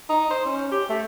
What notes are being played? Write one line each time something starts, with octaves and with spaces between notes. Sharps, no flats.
D#4
C5
C#4
G4
A3